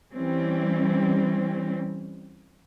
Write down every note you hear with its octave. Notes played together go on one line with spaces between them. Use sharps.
E3 G3 C4 C#4